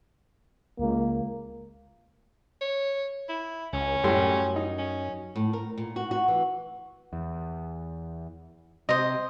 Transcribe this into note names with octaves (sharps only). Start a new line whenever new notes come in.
C#2 A#3
C#5
E4
C#2 C#4
F#2 A2 G3 C6
D#4
C#4
A2
A#4
A#2
F#4
F#4
E3
E2
C3 C5 D#5